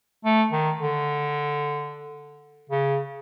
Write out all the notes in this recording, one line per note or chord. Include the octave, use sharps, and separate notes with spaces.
A3
D#3
D3
C#3